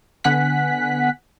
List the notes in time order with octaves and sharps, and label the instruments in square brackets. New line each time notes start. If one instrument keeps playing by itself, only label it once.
[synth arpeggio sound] D3 B3 F#5 G#5 F#6 B6